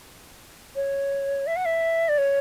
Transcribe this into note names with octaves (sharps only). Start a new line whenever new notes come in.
C#5
E5
F#5
E5
D5
C#5